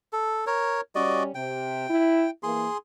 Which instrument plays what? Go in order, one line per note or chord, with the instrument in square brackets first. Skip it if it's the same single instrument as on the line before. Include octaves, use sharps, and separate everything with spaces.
[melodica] A4
A#4 C#5
[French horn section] G3 C#4 [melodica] F#4 D5 D#5
[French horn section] C3 [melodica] G5
[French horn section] E4
[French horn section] E3 A#3 [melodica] G#4 C6